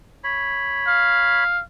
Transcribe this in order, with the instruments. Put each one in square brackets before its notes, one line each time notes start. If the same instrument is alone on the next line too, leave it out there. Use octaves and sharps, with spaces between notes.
[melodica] C#5 B5
[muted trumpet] F5